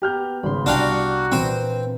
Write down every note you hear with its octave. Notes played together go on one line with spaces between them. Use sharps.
A#3 B3 G4 A#5 F6 G6
G#1 C#3 B5 C6
C2 D4 F#4 F5 G5
A#2 E3 C4 D4 C5